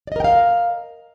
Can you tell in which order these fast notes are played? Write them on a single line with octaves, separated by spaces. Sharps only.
D5 D#5 A#4 G5 F5